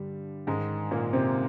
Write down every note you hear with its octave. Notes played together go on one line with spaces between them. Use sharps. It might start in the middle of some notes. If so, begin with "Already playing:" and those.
Already playing: G2 D3 G3
G#2 D#3 G#3
A#2 A#3
C3 C4